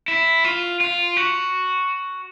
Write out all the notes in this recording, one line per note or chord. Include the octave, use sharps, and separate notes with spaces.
E4
F4
F4
F#4